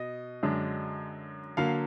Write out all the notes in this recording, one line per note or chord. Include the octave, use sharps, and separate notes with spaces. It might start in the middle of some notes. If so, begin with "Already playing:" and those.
Already playing: B2 D#5
F#2 D3 G#3 D4
D3 F#3 A#3 F5